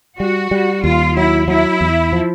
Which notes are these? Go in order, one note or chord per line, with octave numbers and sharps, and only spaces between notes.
G3 F#4
G3
D#2 F4
F#3 E4
F#3 E4
E2
F3